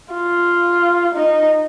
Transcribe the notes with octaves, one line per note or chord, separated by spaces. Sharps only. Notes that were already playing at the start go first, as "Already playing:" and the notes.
F4
D#4